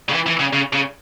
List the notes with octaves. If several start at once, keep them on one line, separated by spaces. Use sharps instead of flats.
C#3
E3
E3
C#3
C#3
C#3